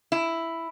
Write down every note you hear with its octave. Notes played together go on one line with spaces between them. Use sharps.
E4